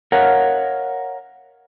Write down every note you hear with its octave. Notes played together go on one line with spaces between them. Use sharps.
A#4 C#5 D#5 F5 F#5